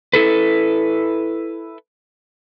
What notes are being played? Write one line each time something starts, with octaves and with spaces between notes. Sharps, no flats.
E4 A4 B4